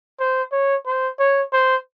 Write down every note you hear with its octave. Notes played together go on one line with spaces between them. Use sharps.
C5
C#5
C5
C#5
C5